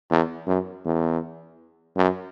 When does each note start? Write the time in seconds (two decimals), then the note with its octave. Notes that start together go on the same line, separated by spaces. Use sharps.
0.11 E2
0.47 F#2
0.85 E2
1.97 F#2